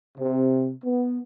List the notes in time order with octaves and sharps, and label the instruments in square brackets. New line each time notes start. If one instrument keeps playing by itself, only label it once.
[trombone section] C3
B3